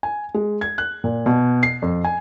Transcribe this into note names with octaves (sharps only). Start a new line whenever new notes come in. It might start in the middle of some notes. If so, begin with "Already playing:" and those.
G#5
G#3
G#6
F#6
A#2
B2
C7
F2
G#5